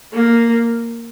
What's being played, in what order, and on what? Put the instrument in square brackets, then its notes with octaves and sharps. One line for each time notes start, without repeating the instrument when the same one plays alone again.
[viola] A#3